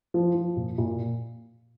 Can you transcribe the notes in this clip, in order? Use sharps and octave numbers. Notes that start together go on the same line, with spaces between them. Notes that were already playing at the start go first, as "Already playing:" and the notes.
F3
F3
A#2
A#2